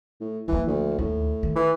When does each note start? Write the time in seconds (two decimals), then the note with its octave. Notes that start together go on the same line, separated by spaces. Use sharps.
0.21 A2
0.48 E3 F3 A#3
0.67 D2
0.99 D#2 A2
1.43 D#3
1.56 E3